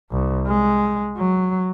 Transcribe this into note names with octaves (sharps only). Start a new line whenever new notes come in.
C2
G#3
F#3